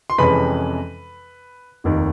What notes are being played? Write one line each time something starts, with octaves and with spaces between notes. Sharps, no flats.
C6
F2 C3 E3 G#3 C#4 B4 B5
F1 D#2 D#3